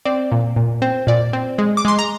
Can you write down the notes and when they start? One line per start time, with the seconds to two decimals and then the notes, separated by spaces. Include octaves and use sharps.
0.05 C4 D5
0.32 A#2
0.56 A#2
0.82 C4
1.07 A#2 D5
1.33 C4
1.58 G#3
1.77 D6
1.85 G#3 C6
1.99 A#5